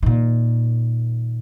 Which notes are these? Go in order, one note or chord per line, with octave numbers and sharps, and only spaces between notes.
A#2 D#3